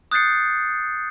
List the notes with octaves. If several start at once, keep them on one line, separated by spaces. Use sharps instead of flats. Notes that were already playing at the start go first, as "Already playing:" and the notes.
D#6 F#6 G6 A6 C7 C#7